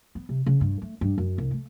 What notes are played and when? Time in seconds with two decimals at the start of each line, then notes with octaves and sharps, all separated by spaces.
0.15 B3
0.29 C3
0.46 C#3
0.61 G2
0.82 A3
1.01 G2
1.18 F#2
1.38 C2
1.51 A3